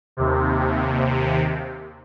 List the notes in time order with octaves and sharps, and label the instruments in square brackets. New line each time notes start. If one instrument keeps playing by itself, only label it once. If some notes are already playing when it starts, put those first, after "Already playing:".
[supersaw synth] D#2 C3